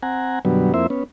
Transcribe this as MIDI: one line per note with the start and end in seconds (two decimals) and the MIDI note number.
0.03 0.39 60
0.03 0.39 78
0.03 0.39 80
0.03 0.39 82
0.45 0.73 42
0.45 0.73 47
0.45 0.73 50
0.45 0.73 54
0.45 0.73 55
0.45 0.73 59
0.74 0.87 41
0.74 0.87 58
0.74 0.87 60
0.74 0.87 64
0.74 0.87 72
0.74 0.87 76
0.90 1.03 59
0.90 1.03 61